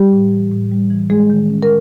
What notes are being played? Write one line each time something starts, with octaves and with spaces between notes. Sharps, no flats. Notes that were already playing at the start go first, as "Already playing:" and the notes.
Already playing: G3 G4
A2
E3
A2
G3
E3
G#3 G#4
D#3
C#4
A#4